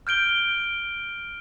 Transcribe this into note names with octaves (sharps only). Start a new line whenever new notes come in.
F6 G6 D7 G7